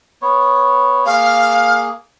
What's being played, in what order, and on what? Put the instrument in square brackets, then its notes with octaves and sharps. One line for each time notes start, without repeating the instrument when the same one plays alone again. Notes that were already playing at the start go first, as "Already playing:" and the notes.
[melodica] B3 C#5
[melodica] A#3 G#4 [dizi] F5